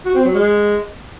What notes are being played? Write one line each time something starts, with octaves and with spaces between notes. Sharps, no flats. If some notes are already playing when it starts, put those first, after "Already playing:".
F#4
C4
F#3
G#3